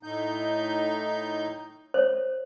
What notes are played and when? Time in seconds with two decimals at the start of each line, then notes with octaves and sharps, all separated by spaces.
0.03 A2 D#4 G6
1.94 C5 C#5